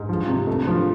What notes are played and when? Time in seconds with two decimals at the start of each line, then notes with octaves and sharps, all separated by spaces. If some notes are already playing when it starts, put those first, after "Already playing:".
Already playing: G#2
0.09 F3
0.28 C3
0.47 A3
0.67 F3